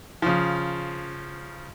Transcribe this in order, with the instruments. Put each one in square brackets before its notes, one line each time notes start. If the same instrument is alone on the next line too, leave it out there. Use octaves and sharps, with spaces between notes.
[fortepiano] C#3 F3